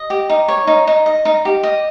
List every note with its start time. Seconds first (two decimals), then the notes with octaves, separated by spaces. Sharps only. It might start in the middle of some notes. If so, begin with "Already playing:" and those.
Already playing: D#5
0.10 G4
0.29 D#4
0.48 C#5
0.67 D#4
0.87 D#4
1.06 D#5
1.25 D#4
1.45 G4
1.63 D#5